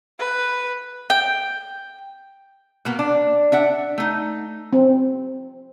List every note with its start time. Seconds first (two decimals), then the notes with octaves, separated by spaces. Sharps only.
0.19 B4
1.10 G5
2.85 B2 A#3 B3
2.99 D4
3.52 D4 E5 F#5
3.98 A3 D#4
4.73 C4